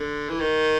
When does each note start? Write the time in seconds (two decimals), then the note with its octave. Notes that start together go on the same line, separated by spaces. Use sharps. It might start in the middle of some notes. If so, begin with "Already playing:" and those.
Already playing: D3
0.29 E3
0.40 D#3